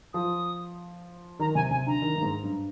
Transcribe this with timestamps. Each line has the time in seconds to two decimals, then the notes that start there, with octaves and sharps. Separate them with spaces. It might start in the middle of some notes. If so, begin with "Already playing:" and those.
0.14 F3 D#6
1.39 D#3 A#5
1.55 C3 G#5
1.71 C3 G#5
1.86 D3 A#5
2.02 D#3
2.16 G2
2.22 G#2
2.44 G2